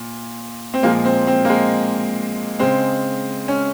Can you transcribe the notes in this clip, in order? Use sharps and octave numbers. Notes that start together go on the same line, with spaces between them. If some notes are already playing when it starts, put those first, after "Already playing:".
Already playing: A#2
C4
A#2 F3 G#3 A#3
C4
C4
A#3
G#3
C#3 G#3 C4
C#4